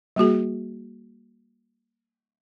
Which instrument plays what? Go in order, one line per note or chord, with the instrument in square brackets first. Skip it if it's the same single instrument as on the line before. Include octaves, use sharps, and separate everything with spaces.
[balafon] G3 A#3 F#4 G#4